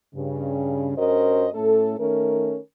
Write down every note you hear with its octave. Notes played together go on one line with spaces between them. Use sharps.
G2 C#3
G2 C#4 F#4 A#4 C5 D#5
A2 A3 C#4 A4
D#3 A3 C#4 A#4